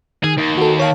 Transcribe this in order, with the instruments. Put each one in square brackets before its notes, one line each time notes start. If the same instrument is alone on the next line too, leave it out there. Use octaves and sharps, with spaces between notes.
[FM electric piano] D#3 [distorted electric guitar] G#4
[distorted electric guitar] D#2
[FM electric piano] F#4 A4
C#5 F5 A5